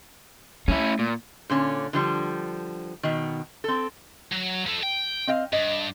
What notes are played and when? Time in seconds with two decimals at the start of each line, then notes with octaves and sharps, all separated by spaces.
0.68 A3 C#4 E4
0.99 A#2
1.50 A#2 D3 C#4
1.93 D3 F3 G3
3.03 B2 D#3
3.64 C4 A4
4.32 F#3
4.67 F3 A4
4.83 G5
5.27 C4 D#5 F5
5.53 G2 D#5